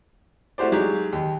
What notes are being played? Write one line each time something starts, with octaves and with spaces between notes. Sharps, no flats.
A3 E4 F#4 G4 C5 D5
F#3 G#3 D#4 G4
D#2